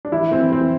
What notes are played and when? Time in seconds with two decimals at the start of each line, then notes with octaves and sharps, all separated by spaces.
0.05 D4
0.12 E3 E4
0.31 E3 C4
0.52 E3 C4